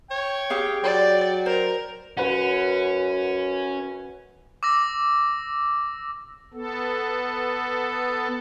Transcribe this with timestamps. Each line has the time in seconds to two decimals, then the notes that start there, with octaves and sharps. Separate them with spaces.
0.11 C#5 G5
0.50 G4 G#4 F5
0.83 F#3 D5 G5
1.46 A#4 C5
2.17 F#2 C#4 B4 F#5
4.63 D6 E6 A#6
6.54 B3 A4